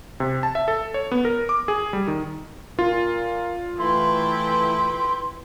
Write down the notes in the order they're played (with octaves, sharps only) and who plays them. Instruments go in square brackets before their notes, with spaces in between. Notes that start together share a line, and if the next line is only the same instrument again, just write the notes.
[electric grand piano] C3
A5
E5
A4
C#5
B3
A#4
D6
G#4
G3
D#3
[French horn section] A#2 A#4 [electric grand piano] F4
[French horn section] E3 A3 [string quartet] E4 B4 G5 [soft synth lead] C6